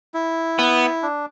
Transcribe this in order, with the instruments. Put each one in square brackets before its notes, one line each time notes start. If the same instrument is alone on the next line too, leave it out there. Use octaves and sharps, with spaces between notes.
[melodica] E4
[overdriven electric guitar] B3
[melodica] D4